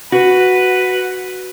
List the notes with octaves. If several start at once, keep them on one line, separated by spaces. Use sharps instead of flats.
F#4 B4